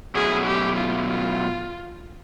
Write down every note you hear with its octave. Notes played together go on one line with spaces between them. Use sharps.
B2 F#3 A3 C#4 E4 G#4
G4
F4
F4